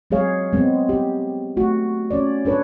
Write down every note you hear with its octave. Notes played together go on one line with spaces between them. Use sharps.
F#3 G#3 C4 G#4 C#5 F5
G#3 B3 C4
G4
A3 F#4
C#4 C#5 D5
D4 A4 B4 C#5